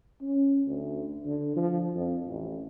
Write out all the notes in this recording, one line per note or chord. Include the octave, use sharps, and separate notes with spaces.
C#4
D2
D3
F3
F2
A1